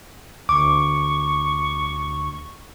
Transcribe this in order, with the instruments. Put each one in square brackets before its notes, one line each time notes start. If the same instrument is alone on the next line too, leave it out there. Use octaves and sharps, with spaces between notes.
[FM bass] D2 [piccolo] C#6 [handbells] D6